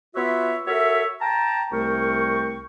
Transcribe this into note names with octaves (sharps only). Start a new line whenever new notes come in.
B3 F4 F#4 C#5 E5
F#4 A4 A#4 C#5 E5
G5 A5 A#5
C2 A3 A#4 G5 C#6